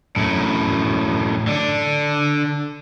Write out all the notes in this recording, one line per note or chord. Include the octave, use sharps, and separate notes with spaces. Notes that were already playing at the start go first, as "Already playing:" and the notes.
F#2 A2
D3 D4